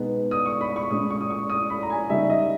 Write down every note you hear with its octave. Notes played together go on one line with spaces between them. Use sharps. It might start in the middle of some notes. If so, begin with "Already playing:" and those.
Already playing: B2 G#3 B3 D#4
D#6
C#6
B5
C#6
A#2 G#3 C#4 D#6
C#6
D#6
C#6
D#6
B5
A#5
G#5
C#3 G3 A#3 D#4 E5
D#5